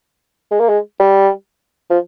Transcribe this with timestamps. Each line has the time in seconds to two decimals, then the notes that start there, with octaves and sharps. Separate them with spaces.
0.51 G#3
0.60 A#3
0.69 G#3
1.00 G3
1.90 F3